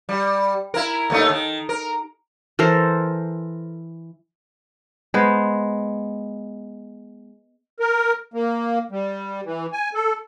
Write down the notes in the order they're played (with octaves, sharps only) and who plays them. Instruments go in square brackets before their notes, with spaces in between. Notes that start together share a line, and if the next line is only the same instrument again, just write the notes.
[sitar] G3
E4 A#4
D#2 A3 D#4
D#3
A#4
[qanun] E3 A4 A#4 C5
[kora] G#3 B3 C5
[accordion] A#4
A#3
G3
E3
G#5
A4